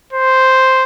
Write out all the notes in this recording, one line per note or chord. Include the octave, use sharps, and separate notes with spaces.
C5